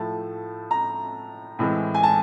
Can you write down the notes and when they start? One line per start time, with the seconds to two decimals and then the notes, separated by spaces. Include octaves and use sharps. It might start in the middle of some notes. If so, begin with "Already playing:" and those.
Already playing: A2 F3 A3 A5
0.71 A#5
1.59 A2 E3 G#3 C4
1.95 G#5
2.03 A5